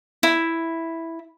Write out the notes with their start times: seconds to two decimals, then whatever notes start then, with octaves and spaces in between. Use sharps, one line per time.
0.23 E4